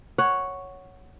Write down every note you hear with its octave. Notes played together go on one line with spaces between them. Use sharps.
C#5 F#5